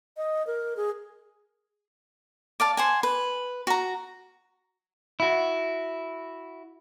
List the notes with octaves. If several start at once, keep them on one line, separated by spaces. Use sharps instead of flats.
D#5
A#4
G#4
D5 F5 A5
C5 F#5 G#5
B4
F#4 A#5
E4 F#4